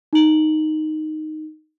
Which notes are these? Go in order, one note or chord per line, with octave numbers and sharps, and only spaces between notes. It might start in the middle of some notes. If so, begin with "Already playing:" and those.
D#4 F#7